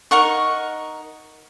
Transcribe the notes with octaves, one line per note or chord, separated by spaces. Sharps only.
D#4 A#4 F#5 C#6